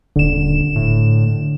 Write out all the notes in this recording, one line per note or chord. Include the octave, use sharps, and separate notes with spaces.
D#1 D3 E7
A2